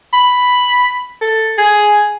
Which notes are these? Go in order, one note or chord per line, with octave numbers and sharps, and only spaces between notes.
B5
A4
G#4